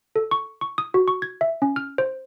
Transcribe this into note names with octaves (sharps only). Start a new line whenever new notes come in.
A4
C#6
C#6
D#6
F#4
C#6
G#6
E5
C#4
F6
C5